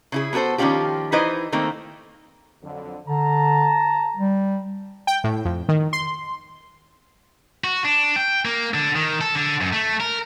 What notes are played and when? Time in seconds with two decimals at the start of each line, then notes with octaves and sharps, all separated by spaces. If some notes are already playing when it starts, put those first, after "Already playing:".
0.12 C#3 E4 G#4
0.33 B3 F#4 G#4 A4 C5
0.58 D#3 F3 G#3 C#4 F4 G4
1.12 E3 D#4 E4 B4 C5 D#5
1.52 D#3 A3 A#3 C4
2.63 F2 D3 F#3
3.08 D3 A5 A#5
4.17 G3
5.07 G5
5.24 A2
5.45 F2
5.69 D#3
5.93 C6
7.64 F#4
7.84 D4
8.16 G5
8.45 A#3
8.74 D3
8.95 D#3
9.21 A4
9.35 D3
9.61 F#2
9.73 A3
10.01 A#4